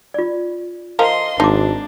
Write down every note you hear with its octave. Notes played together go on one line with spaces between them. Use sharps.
F4 D5
F3 F4 A#4 D#5 F5 C6
G#1 D4 D#4 A5 C6 D6